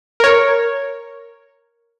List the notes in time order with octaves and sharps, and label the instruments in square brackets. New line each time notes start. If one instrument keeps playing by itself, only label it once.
[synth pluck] A#4 C#5